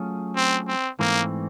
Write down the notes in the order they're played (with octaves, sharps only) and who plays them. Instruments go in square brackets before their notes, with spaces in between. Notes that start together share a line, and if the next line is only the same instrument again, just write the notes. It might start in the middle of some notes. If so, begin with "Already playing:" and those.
Already playing: [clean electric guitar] F#3 A3 C#4 F4 G#4
[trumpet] C4
C4
[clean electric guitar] G#2 E3 A3 C4 [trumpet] A#3